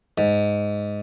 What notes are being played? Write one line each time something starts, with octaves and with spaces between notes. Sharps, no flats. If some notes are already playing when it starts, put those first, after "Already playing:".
G#2